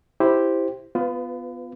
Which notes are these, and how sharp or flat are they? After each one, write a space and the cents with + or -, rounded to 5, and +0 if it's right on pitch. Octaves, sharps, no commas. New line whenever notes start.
E4 +0 G4 +0 C5 +0
B3 +10 F4 +0 B4 +35